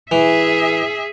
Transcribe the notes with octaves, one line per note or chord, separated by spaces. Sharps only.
E3 G#4 E5